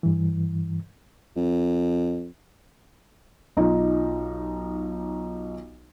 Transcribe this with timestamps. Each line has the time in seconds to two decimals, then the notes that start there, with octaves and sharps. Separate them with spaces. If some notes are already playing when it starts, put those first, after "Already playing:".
0.03 G2 E3
1.36 F2
3.57 B1 D#4 F4